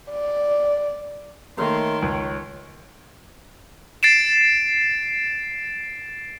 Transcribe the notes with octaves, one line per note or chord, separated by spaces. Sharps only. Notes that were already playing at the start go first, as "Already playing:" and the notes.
D5
D#3 A3 A#3 C#5 C6
C#2 C#5
A6 C7 D7 E7